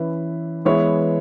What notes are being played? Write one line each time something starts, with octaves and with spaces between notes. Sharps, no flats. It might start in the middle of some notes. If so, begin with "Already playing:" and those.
Already playing: E3 C#4 E4 B4
E3 G#3 B3 E4 C#5